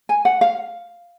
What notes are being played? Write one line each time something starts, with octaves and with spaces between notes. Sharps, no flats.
G#5
F#5
F5